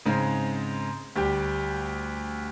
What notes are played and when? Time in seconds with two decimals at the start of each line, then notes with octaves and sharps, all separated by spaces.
0.06 G#2 C#3 G#3 C4
1.16 D2 G3 G4